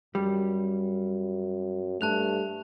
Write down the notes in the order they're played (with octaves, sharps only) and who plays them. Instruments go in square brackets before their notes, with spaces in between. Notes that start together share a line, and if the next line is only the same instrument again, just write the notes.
[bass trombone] F#2 [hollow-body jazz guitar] G3
[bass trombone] G2 [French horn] A3 [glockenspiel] A5 F#6 F7